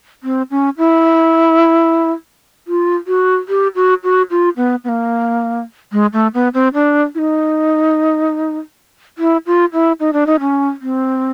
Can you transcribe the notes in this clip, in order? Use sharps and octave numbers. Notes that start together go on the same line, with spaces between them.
C4
C#4
E4
F4
F#4
G4
F#4
F#4
F4
B3
B3
A#3
G#3
A3
B3
C4
D4
E4
D#4
E4
F4
E4
D#4
D4
D#4
C#4
C4